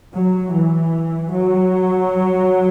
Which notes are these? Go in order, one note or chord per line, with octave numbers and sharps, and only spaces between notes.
F#3
E3
F#3